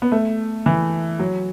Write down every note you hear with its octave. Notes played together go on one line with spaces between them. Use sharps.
B3
A3
E3
F#3